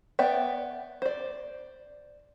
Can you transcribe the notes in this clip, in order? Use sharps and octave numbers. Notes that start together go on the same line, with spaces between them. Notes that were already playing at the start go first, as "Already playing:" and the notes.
B3 D5 E5 G5
C5 D5